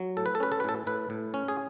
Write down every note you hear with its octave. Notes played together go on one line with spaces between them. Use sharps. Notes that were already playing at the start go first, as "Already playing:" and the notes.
Already playing: F#3
A2 A4
B4
A4
C#4 B4
A4
B4
A2 A4
A2 B4
A2
C#4
G#4